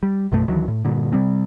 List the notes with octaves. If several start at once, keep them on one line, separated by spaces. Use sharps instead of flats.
G3
A#1 F#2 B2 A3
D2 D#3 E3 F#3
A2
G2 A#2 D3
C3 G3 C4